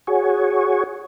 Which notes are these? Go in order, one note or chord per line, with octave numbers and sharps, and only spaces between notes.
F#4 G#4 C#5